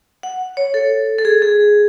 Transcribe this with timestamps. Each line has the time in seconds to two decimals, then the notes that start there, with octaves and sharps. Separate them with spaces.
0.23 F#5
0.57 C#5
0.74 A4
1.19 A4
1.25 G#4
1.42 G#4